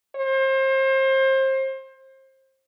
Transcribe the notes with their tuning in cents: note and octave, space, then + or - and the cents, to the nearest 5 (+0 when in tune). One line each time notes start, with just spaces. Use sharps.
C5 +30